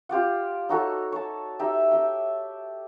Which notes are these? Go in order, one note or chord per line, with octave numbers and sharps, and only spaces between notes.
F4 G4 D5 F#5
D#4 F#4 A4 C#5
C#5 A5
D#4 G4 E5
E5 G5